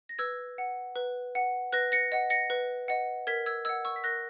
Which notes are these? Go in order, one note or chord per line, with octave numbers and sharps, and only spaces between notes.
A#6
B4 E6 G#6
F#5
B4
F#5
B4 F#6 A#6
A#6 C#7
D#5 F#5
A#6 C#7
B4
D#5 F#5
A#4 G#6 B6
E6 G#6
D#5 F#5 E6 G#6
C#6 E6
B6
A#4 F#6 A#6